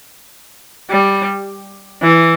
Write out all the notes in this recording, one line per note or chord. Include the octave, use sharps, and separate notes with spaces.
G3
E3